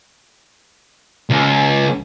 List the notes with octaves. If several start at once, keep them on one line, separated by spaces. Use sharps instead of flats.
C#2